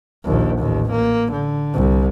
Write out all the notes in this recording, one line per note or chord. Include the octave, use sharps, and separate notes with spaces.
A#1 D#2
A1 D#2
A#3
D3
C2